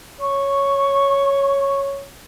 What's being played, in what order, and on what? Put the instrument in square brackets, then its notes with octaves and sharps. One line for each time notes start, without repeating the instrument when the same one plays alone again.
[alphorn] C#5 [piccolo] C#6